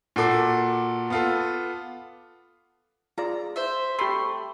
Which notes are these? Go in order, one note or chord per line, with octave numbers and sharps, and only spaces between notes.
A#2 F#4 A4 D6 C7
B3 F4 A4
F4 G#4 D5 A#5
C5 E5
A3 G4 B5 C6